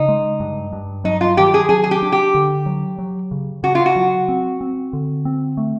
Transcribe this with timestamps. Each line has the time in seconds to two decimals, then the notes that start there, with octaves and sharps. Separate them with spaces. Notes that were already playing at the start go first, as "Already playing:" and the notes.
Already playing: C#3 D#4
0.08 G#3
0.40 G2
0.73 G2
1.04 F#3 D#4
1.21 F4
1.37 D#3 G4
1.54 G#4
1.69 F#3 G#4
1.84 G#4
1.91 G4
2.02 D4
2.12 G4
2.35 D3
2.66 F#3
2.98 F#3
3.31 C#3
3.63 C#3 F#4
3.75 F4
3.86 F#4
3.96 F#3
4.28 C4
4.61 C4
4.93 D3
5.25 C4
5.57 A3